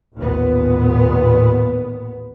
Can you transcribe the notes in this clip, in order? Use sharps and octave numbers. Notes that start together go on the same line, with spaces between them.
A1 D#2 A#2 B3